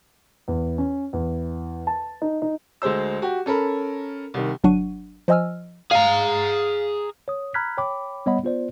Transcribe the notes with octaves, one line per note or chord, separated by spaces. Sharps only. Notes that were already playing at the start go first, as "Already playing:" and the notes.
E2
C#4
E2
A5
D#4
D#4
D2 G#3 G#4 C5 E6
F#4 G4
C#4 A4 A#4 B5
C2 D#3
G1 F#3 D4 F#5 C#6 D#7
F3 C5 D#5 G#5 E6 F6
G#4 F5 A#5
C#5 D#6
A#5 B5 F6 F#6 G#6 B6
C#5 G5 B5 D6
G3 B3 C#5 D#5 F#5 B5
B3 F4 C5 D5